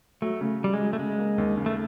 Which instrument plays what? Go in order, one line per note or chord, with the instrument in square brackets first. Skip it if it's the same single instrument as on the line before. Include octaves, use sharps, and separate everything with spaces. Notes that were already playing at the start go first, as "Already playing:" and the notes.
[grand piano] F#3 [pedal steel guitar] A3
[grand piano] C#3
[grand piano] F#3 [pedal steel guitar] G3
[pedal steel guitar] G#3
[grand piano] F#3
[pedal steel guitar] A3
[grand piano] C#3 [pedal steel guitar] G#3
[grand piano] A#3
D#2
C#3
[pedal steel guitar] A3